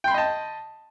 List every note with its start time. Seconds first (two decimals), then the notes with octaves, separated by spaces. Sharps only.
0.04 G5
0.08 C6
0.11 B5
0.14 D#5
0.18 A5